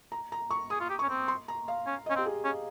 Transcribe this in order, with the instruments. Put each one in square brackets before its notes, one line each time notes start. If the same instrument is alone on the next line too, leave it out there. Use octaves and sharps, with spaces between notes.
[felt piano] A#5
A#5
C#6
[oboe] G#4 [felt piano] D#6
[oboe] F4
G4
[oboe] C#4 [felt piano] C#6
[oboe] C4
[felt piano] C6
A#5
F5
[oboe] C#4
[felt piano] D#5
[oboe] C#4
[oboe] C4 [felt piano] G4
[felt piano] G#4
[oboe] C#4